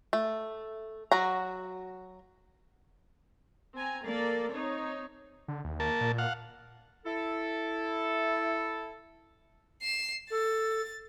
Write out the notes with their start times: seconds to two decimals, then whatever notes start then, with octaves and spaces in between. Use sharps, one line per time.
0.13 A3
1.12 F#3 F#4 A#5
3.76 C4 G#5 A#5
4.05 A#3 A4 A#4 D5
4.52 C4 D#4 C#5
5.48 D3
5.64 D#2
5.80 A#3 A5
6.01 A#2
6.18 F5 F#5
7.05 E4 A4
9.82 C7 E7
10.30 A4 A6